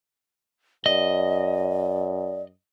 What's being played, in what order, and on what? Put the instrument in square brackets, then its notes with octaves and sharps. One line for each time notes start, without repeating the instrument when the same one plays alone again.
[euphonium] F#2 [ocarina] D5 [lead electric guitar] D#5